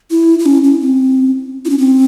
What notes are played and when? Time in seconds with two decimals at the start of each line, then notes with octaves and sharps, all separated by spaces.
0.11 E4
0.39 E4
0.46 C#4
0.64 C#4
0.81 C4
1.65 E4
1.70 C#4
1.78 C4